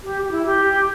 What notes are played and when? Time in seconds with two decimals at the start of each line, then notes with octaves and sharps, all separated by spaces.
0.03 G4
0.22 G4
0.30 E4
0.45 G4